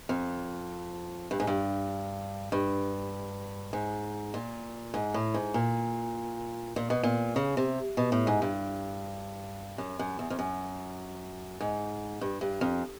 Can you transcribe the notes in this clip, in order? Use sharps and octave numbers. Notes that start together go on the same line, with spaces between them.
F2
G2
G#2
G2
G2
G#2
A#2
G#2
A2
G#2
A#2
A#2
B2
A#2
C#3
C3
B2
A2
G#2
G2
F#2
F#2
E2
F2
F#2
G#2
G2
G2
F2